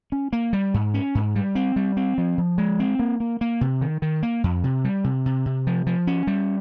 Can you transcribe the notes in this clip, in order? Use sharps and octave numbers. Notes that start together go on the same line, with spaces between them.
C#4
A#3
G3
G#2
C#4
G#2
G3
C4
G3
C4
F3
F3
G#3
C4
A#3
A#3
A#3
C3
D#3
D#3
A#3
F2
C3
G3
C3
C3
C3
F3
F3
C#4
G3